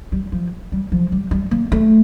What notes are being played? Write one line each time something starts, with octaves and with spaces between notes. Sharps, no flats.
G3
F3
G3
F3
G3
G3
A#3
A3